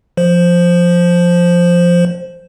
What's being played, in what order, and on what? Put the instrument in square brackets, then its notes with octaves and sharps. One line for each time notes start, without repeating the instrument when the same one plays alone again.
[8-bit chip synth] F3 C5